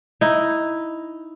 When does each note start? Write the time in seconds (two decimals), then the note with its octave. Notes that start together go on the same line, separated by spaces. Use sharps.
0.21 D#4 E4